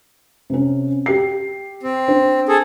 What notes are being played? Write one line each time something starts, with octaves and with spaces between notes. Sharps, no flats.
C3 C#4
G4 C7
C4
D4 C5
G#4 A4